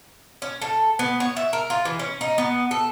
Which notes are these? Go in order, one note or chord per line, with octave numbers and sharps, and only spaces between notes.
C#4
A4
B3
C#5
E5
A#4
F4
E3
C#4
D#4
B3
A4